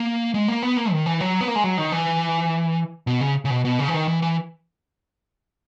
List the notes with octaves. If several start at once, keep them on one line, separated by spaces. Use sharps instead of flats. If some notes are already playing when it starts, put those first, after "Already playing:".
Already playing: A#3
G#3
A#3
B3
A#3
D#3
E3
F#3
B3
A#3
G#3
F#3
D#3
E3
B2
C#3
C#3
B2
B2
C#3
E3
D#3
E3
E3